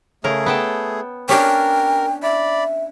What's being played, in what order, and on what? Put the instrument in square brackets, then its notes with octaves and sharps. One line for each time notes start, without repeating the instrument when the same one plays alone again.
[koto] C#3 A#4 [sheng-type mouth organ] A3 G#4
[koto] B3 G5 A5
[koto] C#4 D4 [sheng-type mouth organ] A#4 [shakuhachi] G5
[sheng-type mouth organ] D5 B5 [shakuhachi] E5